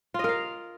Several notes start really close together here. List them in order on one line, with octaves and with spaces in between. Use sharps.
F4 D#5 A#4 F5